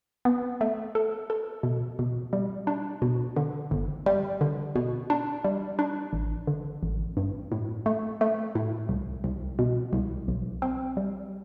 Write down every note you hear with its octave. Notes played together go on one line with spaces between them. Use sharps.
B3
A3
A4
A4
B2
B2
G3
D4
B2
D3
G1
G3
D3
B2
D4
G3
D4
A1
D3
A1
G2
A2
A3
A3
A2
C2
C2
B2
C2
B1
C4
G3